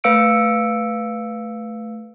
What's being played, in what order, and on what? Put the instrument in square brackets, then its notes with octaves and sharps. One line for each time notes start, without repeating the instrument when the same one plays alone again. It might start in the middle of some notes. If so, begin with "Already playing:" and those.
[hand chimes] A3 B4 F5 E6 C#7 D7